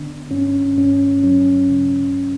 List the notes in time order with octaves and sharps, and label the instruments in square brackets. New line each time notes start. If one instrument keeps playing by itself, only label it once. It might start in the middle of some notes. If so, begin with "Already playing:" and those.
Already playing: [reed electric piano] D3 B3 D4
G2 C#4
G2 C#4
F#3 C#4
C#3